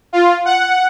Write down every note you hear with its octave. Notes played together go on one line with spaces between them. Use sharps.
F4
F#5